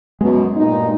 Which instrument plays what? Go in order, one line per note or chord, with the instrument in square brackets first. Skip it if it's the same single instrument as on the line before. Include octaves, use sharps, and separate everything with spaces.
[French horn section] F#2 B2 [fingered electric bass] G#3
[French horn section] G2 A#2 D#4